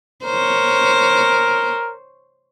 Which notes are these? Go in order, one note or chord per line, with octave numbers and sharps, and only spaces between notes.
A#4 C5 C#5